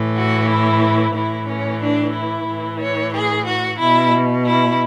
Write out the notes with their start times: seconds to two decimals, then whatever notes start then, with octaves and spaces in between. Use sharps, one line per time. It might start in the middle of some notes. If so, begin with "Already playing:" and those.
Already playing: A2 E3
0.17 F#4
0.50 E4
1.15 A2 E3 E4
1.48 C#4
1.82 D4
2.15 E4
2.47 A2 E3
2.80 C#5
3.15 G#4
3.47 F#4
3.80 B2 E4
4.46 E4